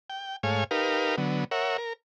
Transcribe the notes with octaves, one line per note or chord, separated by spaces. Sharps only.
G5
G#2 A3 C#5 F5 G#5
D#4 G4 A#4 B4 F5
D3 F#3 B3
A#4 C#5 E5 F#5
A#4